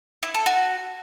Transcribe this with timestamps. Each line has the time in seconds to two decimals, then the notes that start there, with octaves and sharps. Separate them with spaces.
0.23 E4
0.34 A4
0.46 F#4